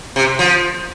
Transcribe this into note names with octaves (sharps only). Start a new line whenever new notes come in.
C3
F3